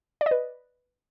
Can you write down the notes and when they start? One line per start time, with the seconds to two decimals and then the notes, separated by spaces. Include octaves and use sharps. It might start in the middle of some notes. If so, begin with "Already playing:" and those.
0.21 D5
0.26 D#5
0.31 B4